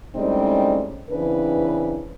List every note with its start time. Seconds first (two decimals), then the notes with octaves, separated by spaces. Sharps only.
0.15 A2 G3 G#3 C4 C#4 D#4
1.09 C#3 E3 C4 D4 B4